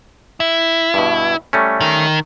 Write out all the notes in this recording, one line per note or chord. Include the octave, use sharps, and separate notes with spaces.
E4
G2 B2
G3 A3 C#4
D#3